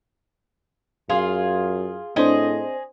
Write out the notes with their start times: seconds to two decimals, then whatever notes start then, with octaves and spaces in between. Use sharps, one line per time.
1.10 F#2 F4 G#4
2.16 A2 C4 D4 G#4 C5 D#5